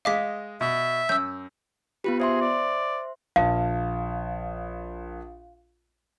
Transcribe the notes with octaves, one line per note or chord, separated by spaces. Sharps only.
G#3 D#5 F5 D6 B6
B2 E5
F#2 E6 G6
B3 F4 G4 B4
G#4 C5 E5 C6
D5
A#1 F5 A5